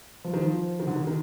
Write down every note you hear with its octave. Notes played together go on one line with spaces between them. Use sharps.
F3
D#3
F3
D#3
D3
D#3
D#3